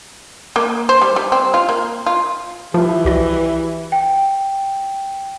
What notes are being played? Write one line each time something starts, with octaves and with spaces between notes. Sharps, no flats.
A#3
C5
G3
G3
C4
F4
A#3
F4
E3 F3 G4 E5
C2 F#4 D5
G5